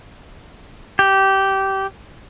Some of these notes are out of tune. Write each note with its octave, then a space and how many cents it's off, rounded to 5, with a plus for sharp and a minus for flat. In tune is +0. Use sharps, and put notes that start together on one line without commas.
G4 -15